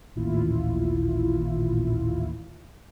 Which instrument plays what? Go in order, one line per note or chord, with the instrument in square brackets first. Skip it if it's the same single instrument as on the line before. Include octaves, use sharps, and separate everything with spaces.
[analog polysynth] A1 D#2 A#2 E4 F4